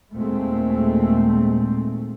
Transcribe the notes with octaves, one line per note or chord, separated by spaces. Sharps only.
D#2 A#2 G#3 A3 C4